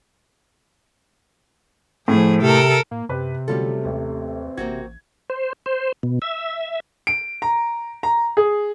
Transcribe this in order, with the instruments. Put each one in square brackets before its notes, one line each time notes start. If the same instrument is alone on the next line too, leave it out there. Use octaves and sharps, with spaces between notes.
[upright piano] A2 [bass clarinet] F3 [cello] A3 G#4
[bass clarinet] C3 [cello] A4 A#4
[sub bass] A2 [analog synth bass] A#3
[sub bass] F#2 [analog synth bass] C3 [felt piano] G4 B4
[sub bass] D3 [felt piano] F#3 G3 F4 [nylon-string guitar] A3 C#4 A4
[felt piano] A1 [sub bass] D#2
[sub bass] A1 [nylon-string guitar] A#3 C4 F#4 [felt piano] G#6
[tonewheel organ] C5
C5
B2
E5
[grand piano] D7
A#5
A#5
G#4